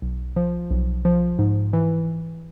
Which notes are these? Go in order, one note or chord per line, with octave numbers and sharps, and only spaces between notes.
B1
F3
B1
F3
G#2
E3